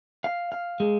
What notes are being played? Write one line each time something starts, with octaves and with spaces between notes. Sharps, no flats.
F5
F5
G#3